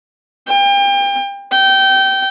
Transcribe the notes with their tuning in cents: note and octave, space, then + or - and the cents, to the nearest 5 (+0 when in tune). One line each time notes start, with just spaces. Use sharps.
G5 +35
G5 -20